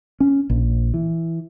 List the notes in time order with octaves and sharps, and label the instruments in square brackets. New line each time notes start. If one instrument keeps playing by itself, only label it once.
[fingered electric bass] C#4
A#1
E3